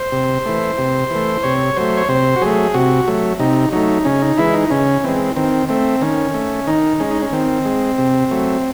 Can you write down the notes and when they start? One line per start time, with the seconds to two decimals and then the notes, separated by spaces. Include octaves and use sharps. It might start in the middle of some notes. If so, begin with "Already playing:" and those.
Already playing: C5
0.12 C3
0.46 E3 A3
0.78 C3
1.10 E3 A3
1.43 C3 C#5
1.77 F#3 A3 C5
1.97 C#5
2.09 C3 C5
2.36 F#4
2.42 F#3 A3 G#4
2.74 C3 F#4
3.08 F#3 A3
3.40 C3 D#4
3.72 F#3 A3 D#4
4.05 C#3 C#4
4.22 D#4
4.38 E3 G#3 E4
4.54 D#4
4.70 C#3 C#4
5.04 E3 G#3 C4
5.36 D#3 C4
5.69 A3 C4
6.01 D#3 C#4
6.34 A3
6.67 D#3 D#4
7.00 G#3 C#4
7.11 D#4
7.22 C#4
7.33 D#3 C4
7.65 G#3
7.98 C3
8.31 F#3 A3